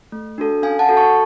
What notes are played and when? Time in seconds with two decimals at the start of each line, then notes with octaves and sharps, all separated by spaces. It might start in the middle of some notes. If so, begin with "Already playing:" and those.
0.12 A3
0.38 D4 F#4 A4
0.62 C#4 F5 G#5
0.79 F#5 A5
0.89 F#4 A4
0.97 A5 C#6